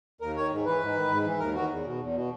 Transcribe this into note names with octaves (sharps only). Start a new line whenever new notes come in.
D#2 A#4
D#3 C#5
G#2
E3 B4
G#2
D#3
G#2
E3
D#2 A#4
D#3 F#4
E2
B2
E2
B2